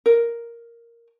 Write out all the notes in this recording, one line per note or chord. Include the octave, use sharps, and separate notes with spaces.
A#4